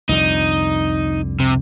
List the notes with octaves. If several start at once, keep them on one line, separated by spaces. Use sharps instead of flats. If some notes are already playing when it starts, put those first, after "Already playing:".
C2 F2 D3 D#4
C3